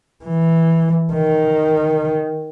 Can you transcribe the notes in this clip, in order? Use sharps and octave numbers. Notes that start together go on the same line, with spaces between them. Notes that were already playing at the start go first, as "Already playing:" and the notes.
E3
D#3